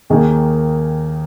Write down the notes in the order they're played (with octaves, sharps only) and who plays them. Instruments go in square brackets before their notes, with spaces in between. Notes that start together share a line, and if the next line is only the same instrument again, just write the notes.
[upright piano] D#2 D#3 A#3 D#4 G#4